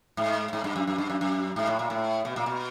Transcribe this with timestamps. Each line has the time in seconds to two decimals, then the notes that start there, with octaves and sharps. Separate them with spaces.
0.17 G#2
0.53 G#2
0.64 G2
0.76 F#2
0.87 F#2
0.98 G2
1.10 F#2
1.21 F#2
1.56 G#2
1.67 A2
1.79 A#2
1.90 A2
2.25 B2
2.36 A#2
2.46 B2